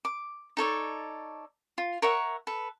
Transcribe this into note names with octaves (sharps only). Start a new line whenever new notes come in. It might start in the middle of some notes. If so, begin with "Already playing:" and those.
D6
D#4 A4 C#5 D5
F4
A#4 C#5 E5 F#5
A4 B4